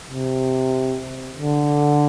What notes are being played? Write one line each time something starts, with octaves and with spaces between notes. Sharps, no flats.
C3
D3